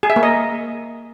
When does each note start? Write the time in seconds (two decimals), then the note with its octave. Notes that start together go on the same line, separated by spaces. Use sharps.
0.03 G#4
0.10 E5
0.16 A#3
0.23 D#5